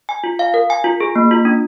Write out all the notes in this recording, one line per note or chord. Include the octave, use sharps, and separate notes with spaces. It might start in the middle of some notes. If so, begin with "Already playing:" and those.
G#5
F4
F5
A#4
G#5
F4
G#4
A#3
F4
D4